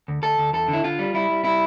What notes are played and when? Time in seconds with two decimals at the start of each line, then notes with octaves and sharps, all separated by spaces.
0.08 D2
0.22 D2 A4
0.38 D2
0.53 E2 A4
0.68 D3
0.73 E4
0.84 D3 F4
0.99 G3
1.14 G3 E4
1.30 G3
1.44 G3 E4